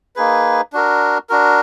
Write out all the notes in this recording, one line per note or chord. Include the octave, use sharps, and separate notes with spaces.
A#3 D#4 G#4 B4
D4 F#4 A#4
D4 F#4 A#4